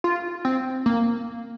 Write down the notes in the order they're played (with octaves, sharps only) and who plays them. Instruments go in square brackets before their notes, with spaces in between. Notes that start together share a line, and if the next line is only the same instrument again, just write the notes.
[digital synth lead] F4
C4
A#3